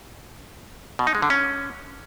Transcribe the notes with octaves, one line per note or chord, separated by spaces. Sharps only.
B2
D#4
G#3
D3
C#4